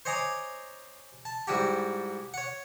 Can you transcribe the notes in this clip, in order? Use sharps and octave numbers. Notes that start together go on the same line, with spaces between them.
C5 C#5 D#5 G#5 A#5 D6
A5
G#2 G3 E4 F#4 G4
C#5 F#5